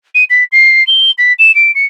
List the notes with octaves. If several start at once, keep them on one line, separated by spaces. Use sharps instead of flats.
D#7
B6
C7
G7
B6
E7
D7
C#7